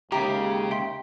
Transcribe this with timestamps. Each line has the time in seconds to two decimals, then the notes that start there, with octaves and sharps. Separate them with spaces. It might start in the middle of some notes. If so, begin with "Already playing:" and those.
0.12 D#2 C#3 G#3 G4 E5 A#5
0.71 E5 G5 C6